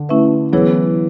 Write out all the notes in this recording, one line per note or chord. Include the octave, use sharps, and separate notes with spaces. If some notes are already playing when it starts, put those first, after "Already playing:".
Already playing: D3
A3 C#4 E4 B4 E5
E3 F#3 B3 E4 G#4 C#5